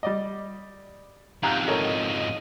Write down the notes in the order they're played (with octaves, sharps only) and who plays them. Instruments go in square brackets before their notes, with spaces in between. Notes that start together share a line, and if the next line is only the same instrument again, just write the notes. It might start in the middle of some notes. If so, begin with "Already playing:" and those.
[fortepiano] G3 D5 D#5
[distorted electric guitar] F2 G#2 [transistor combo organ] G4 F5 [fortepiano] A#5 F#6
[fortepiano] A4 A#4 C#5 [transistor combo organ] D#5